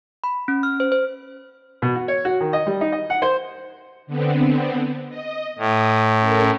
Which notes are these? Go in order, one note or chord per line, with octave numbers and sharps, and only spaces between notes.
B5
C#4
F6
C5
C5
B2
F#4
C#5
F#4
D#3
D#5
G3
D#4
D#5
F#5
C5
D3 B3 C4
D#5
A2 D#6
C#4 A4 A#4